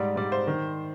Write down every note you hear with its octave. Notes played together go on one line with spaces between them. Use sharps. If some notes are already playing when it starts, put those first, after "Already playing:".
Already playing: G#2 G3 D5
G#2 G3 D5
C5
D#3